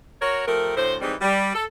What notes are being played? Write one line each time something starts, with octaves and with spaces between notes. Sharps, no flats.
F#4 A#4 C#5
F3 A3 G4 A#4
D2 A2 C5
E3 G3 G#3 C4 D#4
G3
A4